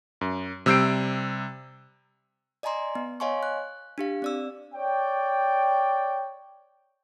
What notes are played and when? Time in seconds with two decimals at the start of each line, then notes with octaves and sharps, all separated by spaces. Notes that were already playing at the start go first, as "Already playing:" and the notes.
0.21 F#2
0.66 C3 G3 E6 G6 C7 D7
2.63 D5 D#5 G#5 A#5 C6
2.95 B3
3.20 C#5 D#5 F5 G#5 C6 C#6
3.43 F#6
3.98 D4 G4 F5
4.22 C4 D5 E6
4.74 C#5 D5 G5